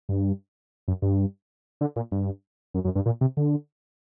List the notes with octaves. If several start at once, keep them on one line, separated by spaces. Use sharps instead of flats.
G2
F#2
G2
D3
A#2
G2
F#2
F#2
G2
A#2
C3
D3